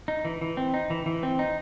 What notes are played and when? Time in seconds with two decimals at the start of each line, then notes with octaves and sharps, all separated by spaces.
0.08 D#4
0.25 E3
0.41 E3
0.57 C4
0.74 D#4
0.90 E3
1.06 E3
1.23 C4
1.39 D#4